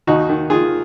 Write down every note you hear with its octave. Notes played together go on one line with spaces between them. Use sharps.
D#2 D#4 F#4
D#3
D#3 F4 G#4